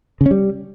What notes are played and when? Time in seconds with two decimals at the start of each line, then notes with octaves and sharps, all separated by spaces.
0.21 C#3
0.26 C#4
0.31 G3